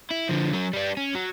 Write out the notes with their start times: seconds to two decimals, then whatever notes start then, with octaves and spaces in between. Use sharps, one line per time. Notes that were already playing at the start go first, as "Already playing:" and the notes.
0.11 E4
0.29 D3 F3
0.53 F#3 C#4
0.73 G3 D4
0.97 C#4
1.15 F#3